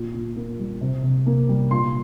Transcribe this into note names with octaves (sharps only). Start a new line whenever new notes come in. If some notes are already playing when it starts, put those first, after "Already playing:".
Already playing: A#2
A#2
A#3
G3
C3
C3
A#3
G3
A#2 C6